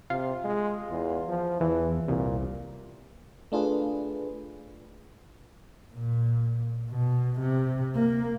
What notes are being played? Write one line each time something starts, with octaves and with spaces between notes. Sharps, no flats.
C3 F4
G#3
E2
F3
E2 E3
C2 A#2
A3 D4 F4 G#4 B4
A#2
B2
C3
A#3